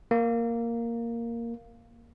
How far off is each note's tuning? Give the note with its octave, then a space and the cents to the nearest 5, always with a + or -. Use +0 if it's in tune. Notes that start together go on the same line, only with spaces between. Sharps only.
A#3 -5